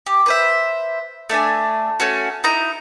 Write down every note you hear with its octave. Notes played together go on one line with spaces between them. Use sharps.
G4
B4 C5 E5
A3 D4 E5 G#5
A3 C#4 F#4
D#4 E4 A#5